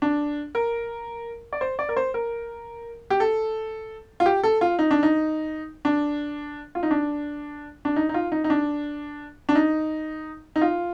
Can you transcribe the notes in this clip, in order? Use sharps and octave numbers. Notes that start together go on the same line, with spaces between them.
D4
A#4
D5
C5
D5
A#4
C5
A#4
G4
A4
F4
G4
A4
F4
D#4
D4
D#4
D4
F4
D#4
D4
D4
D#4
D#4
F4
D#4
D#4
D4
D4
D#4
D#4
F4